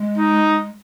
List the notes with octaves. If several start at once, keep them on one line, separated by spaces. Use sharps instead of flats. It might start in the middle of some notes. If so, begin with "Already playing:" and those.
Already playing: G#3
D#4